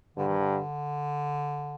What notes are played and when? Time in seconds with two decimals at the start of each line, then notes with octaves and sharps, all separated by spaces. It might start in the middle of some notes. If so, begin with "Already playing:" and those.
0.17 G2 D3
0.29 D#3
0.40 D3